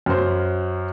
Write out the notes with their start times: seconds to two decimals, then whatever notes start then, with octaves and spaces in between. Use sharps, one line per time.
0.06 F#2 C5